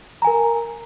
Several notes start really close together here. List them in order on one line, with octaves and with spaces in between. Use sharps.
A#5 G#5 A#4